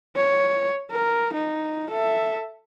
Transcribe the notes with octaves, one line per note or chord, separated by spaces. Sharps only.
C#5
A#4
D#4
A4 E5